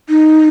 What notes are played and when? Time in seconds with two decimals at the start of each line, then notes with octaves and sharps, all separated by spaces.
0.09 D#4